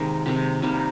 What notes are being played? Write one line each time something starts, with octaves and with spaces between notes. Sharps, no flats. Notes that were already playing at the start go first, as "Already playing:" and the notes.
Already playing: C3 D#3 G#3 A#3
C3 D#3 G#3
C3 D#3 G3 A#3 D#4